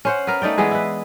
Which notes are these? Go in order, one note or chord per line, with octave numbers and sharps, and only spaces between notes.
C#4 C5 F#5
B3 A#4
A3 D#4 D5 G5
E3 G#3 B3 G#4
E4 B4